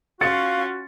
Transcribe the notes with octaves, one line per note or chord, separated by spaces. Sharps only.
C#4 F4 F#4 F5 A6 C#7